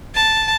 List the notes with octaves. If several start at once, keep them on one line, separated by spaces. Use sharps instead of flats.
A5